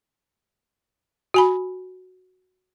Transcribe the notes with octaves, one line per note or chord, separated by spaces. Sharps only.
F#4 G#5 B5